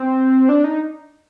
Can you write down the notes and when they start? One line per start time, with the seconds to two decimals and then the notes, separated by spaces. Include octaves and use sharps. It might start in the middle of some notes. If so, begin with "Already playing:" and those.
Already playing: C4
0.49 D4
0.64 D#4